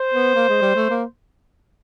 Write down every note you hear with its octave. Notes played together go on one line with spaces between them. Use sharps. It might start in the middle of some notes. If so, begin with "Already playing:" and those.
Already playing: C5
B3
A#3
G#3
G3
A3
A#3